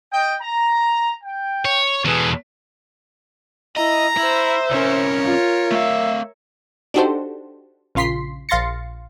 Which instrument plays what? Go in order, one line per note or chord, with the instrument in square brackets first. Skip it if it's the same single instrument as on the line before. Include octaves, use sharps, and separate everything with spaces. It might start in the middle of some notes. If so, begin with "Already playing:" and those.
[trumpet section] D#5 G5
A#5
G5
[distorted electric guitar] C#5
[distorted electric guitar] E2 B2 [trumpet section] G#4 A4 B4
[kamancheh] E4 [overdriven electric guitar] D#5 [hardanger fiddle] A#5
[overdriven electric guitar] E4 [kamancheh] C5 E5
[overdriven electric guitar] C2 C#4 [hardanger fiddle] A#4 C#5
[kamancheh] F4
[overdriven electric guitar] A3 F5 [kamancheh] E5
[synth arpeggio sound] D4 D#4 F#4 G4 A4 C5
A#1 C#3 F4 C6 B6 C7
A#1 F5 C6 A6 A#6 C#7